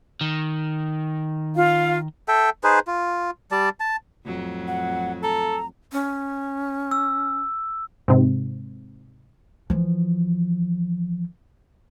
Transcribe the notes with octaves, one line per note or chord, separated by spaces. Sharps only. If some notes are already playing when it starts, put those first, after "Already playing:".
D#3
F4 F5
A4 E5 G5
D#4 G#4 B4 C5
F4
G3 D5 A5
A5
F2 A2 F#3
F#5
A4 A#5
C#4
E6
G#2 C3
E3 F3